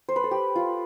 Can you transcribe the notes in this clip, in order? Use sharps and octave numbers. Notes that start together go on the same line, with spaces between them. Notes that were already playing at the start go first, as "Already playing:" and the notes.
C5
B4
A4
G4
F4